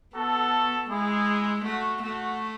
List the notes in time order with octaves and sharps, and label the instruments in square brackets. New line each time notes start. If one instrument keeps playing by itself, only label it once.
[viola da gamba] B3 [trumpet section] F#4 A4
[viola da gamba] G#3 [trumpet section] E4 G#4
[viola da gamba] A3 [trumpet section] F#4
[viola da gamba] A3 [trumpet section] F#4